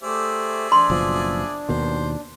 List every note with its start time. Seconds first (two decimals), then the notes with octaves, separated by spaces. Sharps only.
0.03 A3 G4 G#4 C5 D5 E5
0.72 D4 C6
0.90 F#1 B2 F3
1.69 D#2 B2 D#3 C5